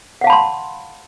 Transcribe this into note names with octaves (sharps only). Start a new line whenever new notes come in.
F5 F#5 A5 B5 C6